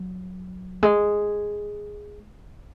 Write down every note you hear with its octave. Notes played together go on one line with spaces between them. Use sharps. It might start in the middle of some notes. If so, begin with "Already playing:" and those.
Already playing: F#3
G#3